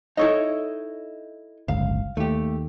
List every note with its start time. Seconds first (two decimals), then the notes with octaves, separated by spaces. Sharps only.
0.17 D#4 E4 A4 C#5 D#5
1.68 D1 G1 C#2 F5
2.17 D#2 A3 G4